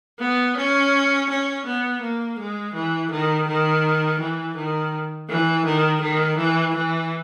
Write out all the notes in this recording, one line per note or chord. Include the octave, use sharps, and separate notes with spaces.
B3
C#4
C#4
B3
A#3
G#3
E3
D#3
D#3
E3
D#3
E3
D#3
D#3
E3
E3